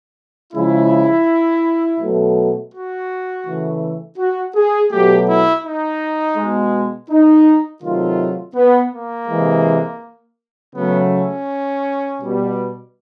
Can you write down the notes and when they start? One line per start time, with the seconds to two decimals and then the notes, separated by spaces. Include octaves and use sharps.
0.53 C#3 F3 G#3 E4
2.00 B2 F#3 A3
2.73 F#4
3.46 C#3 E3 A3
4.18 F#4
4.55 G#4
4.91 B2 F#3 A3 G4
5.28 E4
5.65 D#4
6.37 B2 G#3
7.11 D#4
7.83 C3 D#3 F#3 A3 F4
8.56 B3
8.93 A#3
9.28 C3 E3 G#3
10.74 C#3 F#3 A3 B3
11.12 C#4
12.20 B2 G3